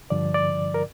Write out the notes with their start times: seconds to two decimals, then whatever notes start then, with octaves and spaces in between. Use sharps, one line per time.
0.10 G2 D3 F3 D5
0.34 D5
0.74 A#4